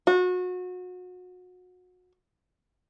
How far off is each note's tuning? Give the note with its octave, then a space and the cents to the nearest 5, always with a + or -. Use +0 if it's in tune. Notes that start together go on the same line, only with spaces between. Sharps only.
F#4 -30